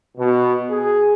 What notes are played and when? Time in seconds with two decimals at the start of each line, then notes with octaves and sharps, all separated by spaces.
0.18 B2
0.70 G#4